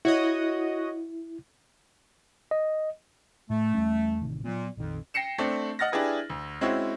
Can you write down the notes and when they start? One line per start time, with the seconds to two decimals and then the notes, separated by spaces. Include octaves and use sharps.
0.05 E4 F#4 C#5 D#5
2.51 D#5
3.50 A2 A3
3.74 E2 G3 C#4
4.21 A1 C3 D#3
4.44 A#2 F#3 G#3 B3
4.77 A#1 F2 D#3
5.14 G5 A#6 C7 C#7 E7
5.38 A3 C4 D4
5.79 D#5 F#5 F6 A6 A#6
5.92 D4 E4 G4 G#4 B4
6.30 D2
6.61 G#3 C4 C#4 E4 F#4